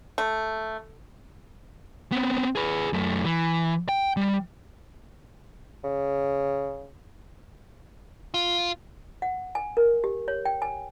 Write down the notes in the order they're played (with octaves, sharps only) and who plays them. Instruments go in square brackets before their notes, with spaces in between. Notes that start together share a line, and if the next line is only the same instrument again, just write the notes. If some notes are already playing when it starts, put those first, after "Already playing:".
[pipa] A3
[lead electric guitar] B3 C4
G#4 B4
F#2 A3
E3
G5
G3
[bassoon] C#3
[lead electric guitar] F4
[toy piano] F#5
G#5
A#4
G4
C#5
G5
G#5